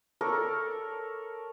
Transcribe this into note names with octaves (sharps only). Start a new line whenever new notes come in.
A4 A#4 C#5 D5